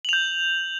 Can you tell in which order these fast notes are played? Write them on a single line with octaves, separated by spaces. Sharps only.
F#7 F7 G6